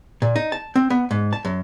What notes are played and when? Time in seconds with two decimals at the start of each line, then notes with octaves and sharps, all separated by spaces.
0.22 A#2
0.36 D#4
0.52 A5
0.76 C4
0.90 B3
1.11 G#2
1.33 A5
1.45 F#2